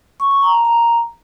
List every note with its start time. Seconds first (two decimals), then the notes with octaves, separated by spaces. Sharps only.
0.20 C#6
0.31 C#6
0.42 A#5
0.54 A5
0.65 A#5